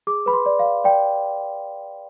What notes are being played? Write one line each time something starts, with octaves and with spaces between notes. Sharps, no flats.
G#4 D6
B4 B5
C6
D5
F5
D5
D5 G5